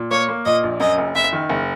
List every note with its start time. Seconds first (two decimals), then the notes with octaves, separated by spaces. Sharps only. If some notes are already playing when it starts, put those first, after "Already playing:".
Already playing: A#2
0.11 A#3 C#5
0.29 A#3
0.45 A#2 D#5
0.64 A#1
0.80 F#2 D#5
0.98 F#1
1.15 F#1 E5
1.33 D#3
1.50 F#1